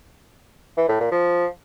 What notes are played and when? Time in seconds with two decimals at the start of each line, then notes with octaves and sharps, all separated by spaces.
0.77 E3
0.89 A2
1.00 A#2
1.12 F3